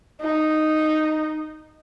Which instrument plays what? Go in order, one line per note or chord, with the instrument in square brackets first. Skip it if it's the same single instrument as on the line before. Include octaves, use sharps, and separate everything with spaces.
[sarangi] D#4